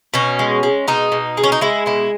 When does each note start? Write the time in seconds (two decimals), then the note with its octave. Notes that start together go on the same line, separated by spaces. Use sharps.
0.14 B2 C#4
0.39 G#3
0.63 G#3
0.88 B2 D#4
1.12 B2
1.37 G#3
1.43 C#4
1.52 D#4
1.61 G#3 E4
1.86 B2 E4